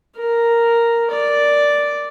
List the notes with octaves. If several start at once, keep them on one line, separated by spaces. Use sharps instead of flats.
A#4
D5